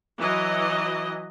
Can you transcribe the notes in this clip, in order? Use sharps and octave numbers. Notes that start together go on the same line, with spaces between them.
E3 F#3 D#5